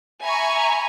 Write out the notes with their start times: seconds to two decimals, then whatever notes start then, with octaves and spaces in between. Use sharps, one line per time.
0.23 E5 G#5 A#5 B5 C#6